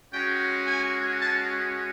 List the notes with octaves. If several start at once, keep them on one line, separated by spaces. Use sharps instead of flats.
G#3 C#4 F#4 G5
G#5
A5